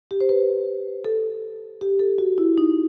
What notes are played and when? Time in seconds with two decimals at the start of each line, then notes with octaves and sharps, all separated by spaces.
0.11 G4
0.21 C5
0.29 B4
1.05 A4
1.81 G4
1.99 A4
2.18 F#4
2.38 E4
2.58 D#4